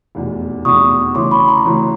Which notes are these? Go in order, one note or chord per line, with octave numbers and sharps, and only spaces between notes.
F1 E2 B2
F1 E2 B2 C#6 D#6
D2 C#3 E3 C6 D6
B5 C#6
A#5 C6
D2 C#3 E3